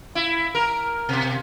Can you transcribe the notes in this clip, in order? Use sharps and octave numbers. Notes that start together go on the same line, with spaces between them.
E4
A#4
B2